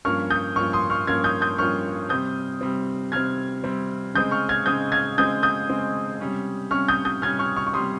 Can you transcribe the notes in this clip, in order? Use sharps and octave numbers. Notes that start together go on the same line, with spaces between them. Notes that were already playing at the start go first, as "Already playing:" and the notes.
G2 F3 A#3 C#4 C#6 F6
D#6 G6
G2 F3 A#3 C#4 C#6 F6
C6 D#6
C#6 F6
G2 F3 A#3 C#4 F6 G#6
D#6 G6
D#6 G6
G2 F3 A#3 C#4 C#6 F6
C3 G3 C4 D#6 G6
C3 G3 C4
C3 G3 C4 F6 G#6
C3 G3 C4
C#3 G#3 C4 D#6 G6
C#6 F6
F6 G#6
C#3 G#3 C4 D#6 G6
F6 G#6
C#3 G#3 C4 D#6 G6
D#6 G6
C#3 G#3 C4
C3 G3 C#4
C3 G3 C#4 C#6 F6
D#6 G6
D#6 G6
C3 G3 C#4 F6 G#6
C#6 F6
C#6 F6
C#6
C3 G3 C#4 C6 D#6